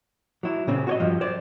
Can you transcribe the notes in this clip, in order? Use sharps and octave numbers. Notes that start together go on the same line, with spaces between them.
F#3 E4
A#2 C#3 C4
F#4 C#5 D#5
G2 F3 F#3
C5 D5